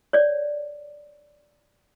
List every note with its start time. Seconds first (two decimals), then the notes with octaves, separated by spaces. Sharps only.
0.13 C#5 D5